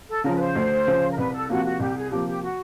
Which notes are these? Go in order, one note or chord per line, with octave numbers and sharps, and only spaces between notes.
A4
C#3 F3 A#4
B4
C5
D2
C#3 F3
A#4
C2 B4
A4
C3 F3 A#3 F#4
F#4
C2 G4
G#4
C3 F3 A#3 G4
G4
F#4